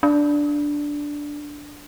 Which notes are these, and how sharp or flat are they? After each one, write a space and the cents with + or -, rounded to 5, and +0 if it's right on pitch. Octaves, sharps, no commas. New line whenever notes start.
D4 -5